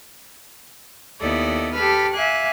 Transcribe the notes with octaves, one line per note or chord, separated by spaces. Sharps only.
D#2 B3 E4 A4 D5 D#5
G4 A4 B4 B5 F6
E5 F5 G#5 D6 F#6